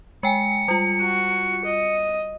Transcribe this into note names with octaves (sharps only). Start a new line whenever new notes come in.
G#3 G5 G#5 C#7
G3 F4
F#4
D#5